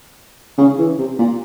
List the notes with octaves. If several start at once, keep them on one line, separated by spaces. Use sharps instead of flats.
C#3
E3
C3
A#2